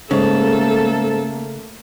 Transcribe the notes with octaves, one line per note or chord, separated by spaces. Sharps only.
G#2 C#3 A3 A#3 A4